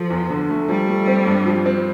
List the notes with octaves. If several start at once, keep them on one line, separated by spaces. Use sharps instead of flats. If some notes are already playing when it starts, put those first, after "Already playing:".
Already playing: F3 A4
E2
D3
A3
F3 G3
A3
C4
G2
F3
C4